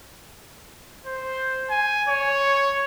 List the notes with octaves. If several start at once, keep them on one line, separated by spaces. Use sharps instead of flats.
C5
G#5
C#5